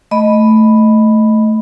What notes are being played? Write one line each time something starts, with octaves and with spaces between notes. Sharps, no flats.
A3 D#5 B5